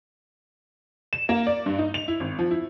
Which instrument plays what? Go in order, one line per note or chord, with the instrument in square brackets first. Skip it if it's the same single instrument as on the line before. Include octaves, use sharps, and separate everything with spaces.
[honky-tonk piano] E7
A#3
D5
G2
D#4
F7
E4
G#1
F3
E4